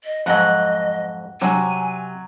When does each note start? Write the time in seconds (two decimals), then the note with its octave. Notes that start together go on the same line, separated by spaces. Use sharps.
0.04 D#5
0.26 F2 G#2 F#3 D#5 F#5
1.42 C3 F#3 G#5